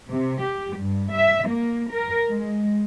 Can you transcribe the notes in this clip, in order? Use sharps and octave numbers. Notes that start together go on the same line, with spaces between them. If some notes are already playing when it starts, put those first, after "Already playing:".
C3
G4
G2
E5
A#3
A#4
G#3